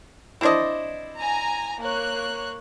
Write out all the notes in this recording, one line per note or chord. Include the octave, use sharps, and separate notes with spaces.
C4 D4 E4 C5 D5 D#5
G#5 A#5
A#3 C#5 F#6